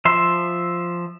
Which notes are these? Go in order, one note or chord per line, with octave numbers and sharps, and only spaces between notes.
F3 E5 C6